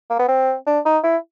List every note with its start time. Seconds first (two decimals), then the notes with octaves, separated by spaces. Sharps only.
0.10 A#3
0.19 B3
0.28 C4
0.67 D4
0.85 D#4
1.04 E4